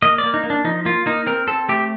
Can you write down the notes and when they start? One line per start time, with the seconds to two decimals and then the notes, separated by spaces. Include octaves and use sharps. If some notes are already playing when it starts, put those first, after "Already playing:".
0.02 A#3 D#5
0.18 D5
0.24 A#3
0.34 D#4
0.44 A#3
0.50 D4
0.64 F3 D#4
0.85 A#3 F4
1.06 A#3 D#4
1.27 C4 A#4
1.47 C4 A4
1.69 A3 G4